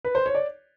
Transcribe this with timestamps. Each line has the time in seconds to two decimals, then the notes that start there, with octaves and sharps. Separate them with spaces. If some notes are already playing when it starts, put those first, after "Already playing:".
0.05 B4
0.15 C5
0.26 C#5
0.35 D5